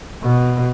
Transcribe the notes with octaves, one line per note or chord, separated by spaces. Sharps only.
B2